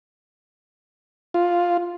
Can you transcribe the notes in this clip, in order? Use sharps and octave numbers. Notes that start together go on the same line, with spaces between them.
F4